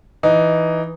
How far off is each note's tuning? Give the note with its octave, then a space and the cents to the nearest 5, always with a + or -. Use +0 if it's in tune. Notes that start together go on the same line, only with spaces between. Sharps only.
E3 +0 D#4 +0